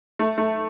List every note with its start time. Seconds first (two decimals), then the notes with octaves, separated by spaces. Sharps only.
0.19 A3
0.38 A3